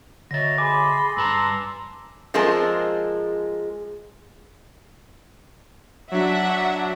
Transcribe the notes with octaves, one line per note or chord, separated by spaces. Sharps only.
D3 C#5 D#5 E5 A6 A#6
G#4 G#5 B5 C6 D6
G2 B4 A5 A#5 C6 E6 A#6
F3 G#3 C4 G#4 A#4 A5
F#3 D4 E5 F#5